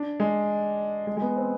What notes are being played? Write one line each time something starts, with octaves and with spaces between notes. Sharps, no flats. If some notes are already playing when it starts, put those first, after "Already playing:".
Already playing: D4
G#3
G#3
G#3
B3
C4